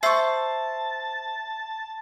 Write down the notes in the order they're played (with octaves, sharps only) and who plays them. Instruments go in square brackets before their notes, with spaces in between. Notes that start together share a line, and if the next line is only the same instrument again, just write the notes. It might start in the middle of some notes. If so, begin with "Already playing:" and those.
[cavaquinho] C5 C#6 [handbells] E5 E6 C7 [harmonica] A5